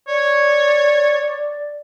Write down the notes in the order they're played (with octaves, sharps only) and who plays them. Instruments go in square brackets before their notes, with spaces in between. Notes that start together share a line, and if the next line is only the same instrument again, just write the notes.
[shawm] C#5 [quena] D5